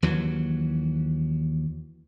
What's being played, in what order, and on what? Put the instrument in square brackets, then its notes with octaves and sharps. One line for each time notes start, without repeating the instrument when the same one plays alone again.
[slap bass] D#2 E3 F#3